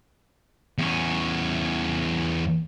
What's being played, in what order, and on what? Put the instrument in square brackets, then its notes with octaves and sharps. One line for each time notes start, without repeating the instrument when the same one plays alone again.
[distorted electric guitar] E2 C#4